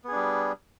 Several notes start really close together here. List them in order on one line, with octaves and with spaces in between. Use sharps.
B3 G#4 D4 G3